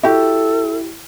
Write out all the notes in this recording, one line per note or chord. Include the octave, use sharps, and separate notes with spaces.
E4 F#4 G4 A4